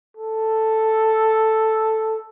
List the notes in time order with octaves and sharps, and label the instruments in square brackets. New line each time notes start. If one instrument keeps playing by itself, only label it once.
[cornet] A4